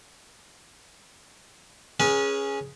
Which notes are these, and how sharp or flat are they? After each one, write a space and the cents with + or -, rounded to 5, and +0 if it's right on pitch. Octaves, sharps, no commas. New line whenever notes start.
C#4 -5 G#4 +0 B4 -40